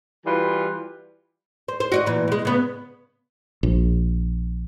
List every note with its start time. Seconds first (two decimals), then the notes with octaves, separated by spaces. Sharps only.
0.25 E3 G3 F4 F#4 B4
1.68 C5
1.80 C5
1.92 F#4 D5 D#5
2.06 A#2 E3
2.28 B2 G#3
2.45 C#3 B3
3.63 A#1